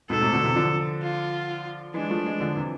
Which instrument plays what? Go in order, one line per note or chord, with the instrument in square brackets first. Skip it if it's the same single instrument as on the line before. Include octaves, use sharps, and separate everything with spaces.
[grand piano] G#2 B2 [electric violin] A4
[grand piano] A2 C3
B2 D3
C3 E3
D3 F3
[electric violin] F4
[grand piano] E3 G#3 [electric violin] D4
[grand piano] F3 A3
E3 G#3
D3 F3
C3 E3